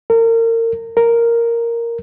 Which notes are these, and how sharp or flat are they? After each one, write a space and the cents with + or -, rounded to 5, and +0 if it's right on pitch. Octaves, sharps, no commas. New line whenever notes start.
A#4 -35
A#4 -5